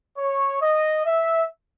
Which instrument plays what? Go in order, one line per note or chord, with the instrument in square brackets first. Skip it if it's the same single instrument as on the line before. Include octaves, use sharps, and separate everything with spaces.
[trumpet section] C#5
D#5
E5